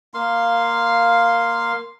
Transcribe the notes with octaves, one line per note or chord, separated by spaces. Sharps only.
A#3 F5 C6